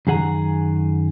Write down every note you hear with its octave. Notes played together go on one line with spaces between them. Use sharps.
F#2 D#3 G#4 F#5 G#5 A#5